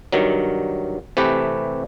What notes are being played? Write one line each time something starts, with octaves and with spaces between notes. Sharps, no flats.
G2 D#3 F#3
C3 E3 A3 G4 B4